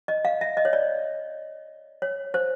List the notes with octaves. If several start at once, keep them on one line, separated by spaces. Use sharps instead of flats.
D#5
F5
E5
D#5
C#5
D5
C#5
C5